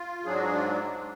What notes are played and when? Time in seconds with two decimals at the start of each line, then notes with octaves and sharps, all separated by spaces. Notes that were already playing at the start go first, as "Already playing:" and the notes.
Already playing: F4
0.24 G#2 F#3 D4 G#4
0.35 F#4
0.44 G#4
0.54 F4